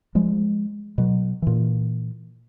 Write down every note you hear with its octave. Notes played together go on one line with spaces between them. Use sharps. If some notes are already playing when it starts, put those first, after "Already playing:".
F3 G#3
B2 F#3
A#2 E3